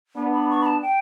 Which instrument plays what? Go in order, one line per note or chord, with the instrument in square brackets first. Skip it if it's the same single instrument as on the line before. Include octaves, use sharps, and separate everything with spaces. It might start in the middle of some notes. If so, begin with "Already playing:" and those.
[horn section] B3 D4
[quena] B5
C#6
B5
A5
G5